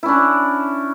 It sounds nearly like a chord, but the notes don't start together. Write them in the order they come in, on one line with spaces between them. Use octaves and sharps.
E4 C#4 D4